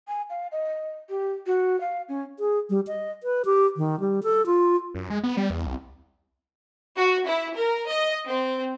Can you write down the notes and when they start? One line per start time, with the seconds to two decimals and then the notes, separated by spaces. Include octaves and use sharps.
0.08 G#5
0.30 F5
0.52 D#5
1.09 G4
1.46 F#4
1.80 F5
2.08 C#4
2.38 G#4
2.70 G3
2.87 D#5
3.23 B4
3.45 G4
3.77 D#3
4.00 G3
4.23 A4
4.46 F4
4.95 F#2
5.10 G#3
5.23 B3
5.37 G3
5.50 E2
5.67 C2
6.96 F#4
7.25 E4
7.55 A#4
7.88 D#5
8.27 C4